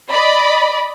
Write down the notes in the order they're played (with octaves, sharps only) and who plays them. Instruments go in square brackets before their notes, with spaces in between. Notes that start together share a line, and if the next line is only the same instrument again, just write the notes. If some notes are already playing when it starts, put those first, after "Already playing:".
[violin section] D5 D#5 B5